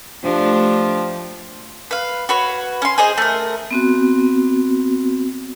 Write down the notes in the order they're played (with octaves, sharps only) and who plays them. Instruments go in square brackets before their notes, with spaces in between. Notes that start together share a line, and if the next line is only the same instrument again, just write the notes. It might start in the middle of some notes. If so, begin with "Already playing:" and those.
[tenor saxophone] F3 [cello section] A3 D4 G4
[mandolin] B4 F5
F#4 B4 C#5
C#4 C6
G#4 C5 D#5
A3 A#4
[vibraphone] B3 C4 F#4